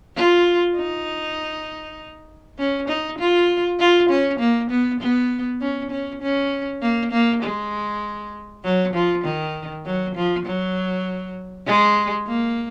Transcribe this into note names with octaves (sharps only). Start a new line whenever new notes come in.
F4
D#4
C#4
D#4
F4
F4
C#4
A#3
B3
B3
C#4
C#4
C#4
A#3
A#3
G#3
F#3
F3
D#3
F#3
F3
F#3
G#3
A#3